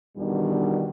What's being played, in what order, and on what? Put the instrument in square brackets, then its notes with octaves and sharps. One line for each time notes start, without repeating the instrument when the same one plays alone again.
[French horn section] E2 B2 D#3 G3 D4